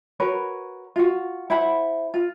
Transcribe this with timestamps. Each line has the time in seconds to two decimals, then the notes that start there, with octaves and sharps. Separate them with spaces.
0.20 F#4 A#4 B4 C#5
0.96 F4 F#4
1.50 E4 C5 F#5 B5
2.14 F4